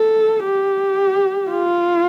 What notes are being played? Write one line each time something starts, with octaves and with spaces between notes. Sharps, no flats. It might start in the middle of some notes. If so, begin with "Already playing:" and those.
Already playing: A4
G4
F4